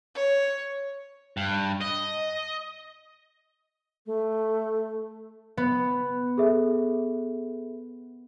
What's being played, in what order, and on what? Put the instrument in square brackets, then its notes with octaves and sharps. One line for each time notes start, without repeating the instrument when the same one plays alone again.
[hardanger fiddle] C#5
[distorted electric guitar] G2
D#5
[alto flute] A3
[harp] B3
[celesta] G#4 A4 E5